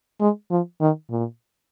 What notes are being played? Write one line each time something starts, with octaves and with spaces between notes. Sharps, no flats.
G#3
F3
D#3
A#2